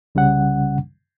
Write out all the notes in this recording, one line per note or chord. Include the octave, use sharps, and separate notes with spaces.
C2 C#3 G3 C#4 F#5